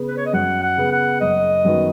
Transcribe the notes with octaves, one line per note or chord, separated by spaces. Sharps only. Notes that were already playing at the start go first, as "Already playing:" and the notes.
Already playing: C#3 B3
B4
C#5
D#5
F#2 F#5
F#5
C#3 B3
F#5
F#1 D#5
F#2 D#3 B3 F#4